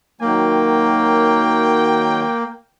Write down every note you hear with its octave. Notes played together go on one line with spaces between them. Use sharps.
D#3 F#3 A#3 G5